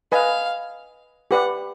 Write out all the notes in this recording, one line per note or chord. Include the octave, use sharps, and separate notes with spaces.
B4 D#5 F5 G#5
G4 B4 D5 F#5